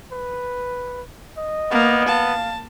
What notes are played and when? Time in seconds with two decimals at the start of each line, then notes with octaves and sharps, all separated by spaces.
0.12 B4
1.37 D#5
1.71 A#3 B3
2.09 F5 A5